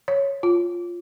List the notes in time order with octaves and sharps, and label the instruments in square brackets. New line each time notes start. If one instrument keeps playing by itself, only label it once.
[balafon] C#5
F4